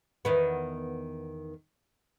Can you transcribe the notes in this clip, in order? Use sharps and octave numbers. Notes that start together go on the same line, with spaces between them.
E2 D#3 B3